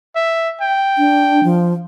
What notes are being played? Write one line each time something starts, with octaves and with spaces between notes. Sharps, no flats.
E5
G5
D4
F3